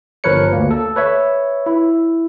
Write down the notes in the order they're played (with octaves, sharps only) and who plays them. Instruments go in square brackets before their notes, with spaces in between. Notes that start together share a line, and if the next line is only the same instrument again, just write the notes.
[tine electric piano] G1 F3 A#4 B4 C#5 C#7
D2 A#3
A4
B4 C#5 E5
E4